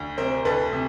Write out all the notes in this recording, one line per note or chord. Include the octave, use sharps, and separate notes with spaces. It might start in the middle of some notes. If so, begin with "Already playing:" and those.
Already playing: D2
C3 A#4 C5
D2 A4 B4
C3